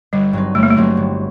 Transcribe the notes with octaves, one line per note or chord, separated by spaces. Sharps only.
G1 G3
G2 F#3 C4 D#4
G1 A3
A#3
A3
G2 F#3 C4 D#4
G1